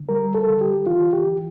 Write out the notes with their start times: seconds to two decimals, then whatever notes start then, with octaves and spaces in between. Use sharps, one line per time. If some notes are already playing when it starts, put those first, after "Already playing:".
Already playing: D3
0.09 G3 A#4
0.35 A4
0.48 D3
0.61 G4
0.87 E3 F4
1.13 G4
1.27 E3